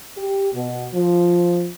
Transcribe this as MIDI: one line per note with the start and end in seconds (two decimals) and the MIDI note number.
0.16 0.48 67
0.53 0.86 47
0.93 1.67 53